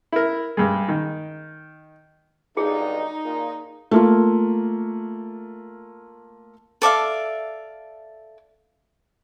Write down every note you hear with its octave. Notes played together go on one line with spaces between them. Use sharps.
E4 A#4
G2 G#3
D#3
B1 G2 D3 D#4 G#4
A#2
A3 A#3 F4
A4 D5 E5 F5